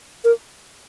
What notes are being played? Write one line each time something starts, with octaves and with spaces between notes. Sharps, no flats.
A#4